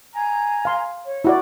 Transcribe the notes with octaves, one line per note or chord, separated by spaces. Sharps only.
G#5 A#5
F5 C6
C#5
E4 F#4 D5